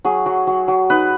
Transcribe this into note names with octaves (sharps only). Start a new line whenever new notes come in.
F#3 G#4
F#3
F#3
F#3
D#4 B4